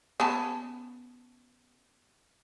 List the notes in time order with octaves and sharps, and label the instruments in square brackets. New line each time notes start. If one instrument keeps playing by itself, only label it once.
[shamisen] B3 C#4 A5